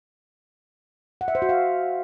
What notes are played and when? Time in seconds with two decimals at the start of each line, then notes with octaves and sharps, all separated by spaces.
1.21 F#5
1.28 E5
1.35 C5
1.42 F#4
1.49 F5